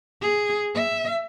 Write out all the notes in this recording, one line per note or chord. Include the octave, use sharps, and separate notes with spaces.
G#4
E5